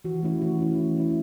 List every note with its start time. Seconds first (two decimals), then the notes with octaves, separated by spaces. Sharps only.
0.04 E3 F#4
0.23 A3 C#4 E4
0.42 E3 F#4
0.60 A3 C#4 E4
0.79 E3
0.97 A3 C#4 E4